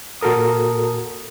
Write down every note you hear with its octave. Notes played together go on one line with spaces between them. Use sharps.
A#2 F#4 A4 A#4 D#6